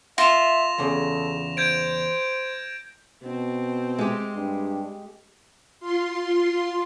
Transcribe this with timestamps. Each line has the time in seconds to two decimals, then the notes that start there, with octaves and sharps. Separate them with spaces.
0.18 F4 E5 A#6 E7 F7
0.78 E2 C#3 A4
1.57 C5 G6 G#6 D7
3.23 B2 C4
3.98 G#3 G4
4.34 G2
5.80 F4 C6